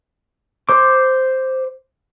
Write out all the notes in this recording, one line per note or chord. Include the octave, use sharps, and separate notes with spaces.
C5 D6